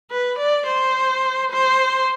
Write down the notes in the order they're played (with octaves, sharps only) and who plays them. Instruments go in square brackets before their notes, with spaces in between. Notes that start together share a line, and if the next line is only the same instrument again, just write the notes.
[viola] B4
D5
C5
C5